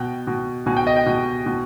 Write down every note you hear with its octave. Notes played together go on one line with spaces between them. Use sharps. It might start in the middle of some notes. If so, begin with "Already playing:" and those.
Already playing: B2 G5
B2
B2 G#5
G5
D#5
G5
B2
B2